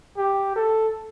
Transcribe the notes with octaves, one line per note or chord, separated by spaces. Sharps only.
G4
A4